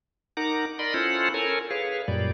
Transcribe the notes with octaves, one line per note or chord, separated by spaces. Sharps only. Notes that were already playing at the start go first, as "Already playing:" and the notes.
D#4 A#4 F#5 A#5 D6
A#4 D5 D#5 B5 C6
C#4 E4 F4 A4 C5 F#5
A4 A#4 C#5 G#5
G#4 B4 C#5 F5
F#2 A#2 G3 D5